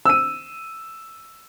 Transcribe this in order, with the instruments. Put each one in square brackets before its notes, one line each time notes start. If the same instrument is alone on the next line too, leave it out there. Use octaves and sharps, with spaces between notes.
[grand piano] E6 D#7